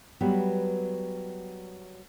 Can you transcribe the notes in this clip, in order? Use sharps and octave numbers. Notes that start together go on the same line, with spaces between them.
F#3 G3 B3